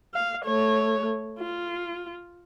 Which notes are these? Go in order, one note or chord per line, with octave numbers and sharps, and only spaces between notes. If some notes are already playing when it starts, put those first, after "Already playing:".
F5
A3 C#5
F4